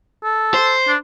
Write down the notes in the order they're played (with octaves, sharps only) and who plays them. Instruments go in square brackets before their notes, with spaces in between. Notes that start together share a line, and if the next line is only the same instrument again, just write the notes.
[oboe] A4
[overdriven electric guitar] C5
[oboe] D4